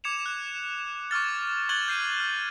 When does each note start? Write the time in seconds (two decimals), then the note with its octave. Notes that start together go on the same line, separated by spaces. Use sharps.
0.04 D6 G#6 C#7 E7 F7
0.26 F#6
1.11 C#6 D6 F6 A6
1.69 C#6 F#6 G#6 A6 F#7 G7
1.88 G6 C7 D#7
2.20 F6